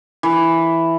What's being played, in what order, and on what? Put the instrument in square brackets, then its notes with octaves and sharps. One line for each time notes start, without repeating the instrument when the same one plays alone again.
[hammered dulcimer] E3